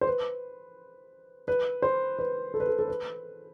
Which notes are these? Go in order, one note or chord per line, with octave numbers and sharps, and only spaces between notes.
C5
B4
B4
C5
B4
A4
B4
A4
A4
B4